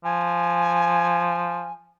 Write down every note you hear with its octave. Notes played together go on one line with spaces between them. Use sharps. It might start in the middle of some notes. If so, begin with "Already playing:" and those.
F3 G#5